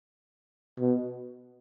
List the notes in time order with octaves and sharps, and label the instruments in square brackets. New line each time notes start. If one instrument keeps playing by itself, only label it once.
[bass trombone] B2